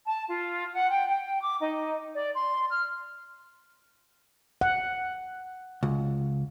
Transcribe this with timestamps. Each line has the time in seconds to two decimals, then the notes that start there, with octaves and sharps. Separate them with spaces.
0.07 A5
0.29 F4
0.73 F#5
0.90 G5
1.08 G5
1.41 D6
1.60 D#4
2.14 D5
2.35 C6
2.71 F6
4.61 F#5
5.83 C#2